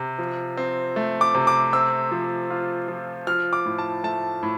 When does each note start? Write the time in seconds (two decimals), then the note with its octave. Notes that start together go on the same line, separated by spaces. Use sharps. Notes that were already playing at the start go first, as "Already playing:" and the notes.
Already playing: C3
0.18 F3
0.57 C4
0.96 A3
1.21 D6
1.35 C3
1.47 D6
1.73 C4 E6
2.11 F3
2.50 F4
2.88 F3
3.27 F3 F6
3.53 D6
3.66 A2
3.79 A5
4.04 A3 A5
4.43 A2